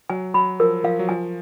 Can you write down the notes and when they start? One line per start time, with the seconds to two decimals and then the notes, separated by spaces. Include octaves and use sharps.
0.10 F#3 G#5
0.34 F#3 B5
0.60 F3 A#4
0.84 F3 F5
0.99 F#3
1.09 F3 G#5